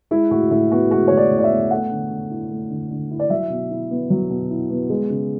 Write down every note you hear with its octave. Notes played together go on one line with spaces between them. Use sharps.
G#3 E4
A2 F#4
A2 E4
B3 F#4
G#3 F#4
A2 C#5
D5
A2
D5
E5
B3
A3 F#5
D3
D3
E4
A3
D3
D3
E4
D5
F#3 E5
B2
E4
B3
F#3
B2
E4
B3
G#3
C#3